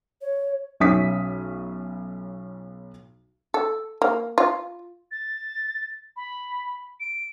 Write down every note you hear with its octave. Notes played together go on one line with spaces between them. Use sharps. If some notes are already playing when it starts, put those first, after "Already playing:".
C#5
B1 C#4 E5 D#6 B6
A4
A#3
F4
A6
B5
D7